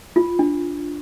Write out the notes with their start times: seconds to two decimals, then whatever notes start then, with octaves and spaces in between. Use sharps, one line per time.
0.16 F4
0.39 D4